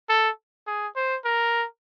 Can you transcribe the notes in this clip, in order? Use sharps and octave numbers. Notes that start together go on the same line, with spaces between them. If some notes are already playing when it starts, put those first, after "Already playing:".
A4
G#4
C5
A#4